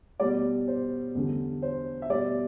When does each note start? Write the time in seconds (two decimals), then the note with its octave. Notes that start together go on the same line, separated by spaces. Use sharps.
0.20 B2 G3 D5
0.68 C5
1.15 E2 D3 G3
1.62 C5
2.02 E5
2.10 B2 G3 D5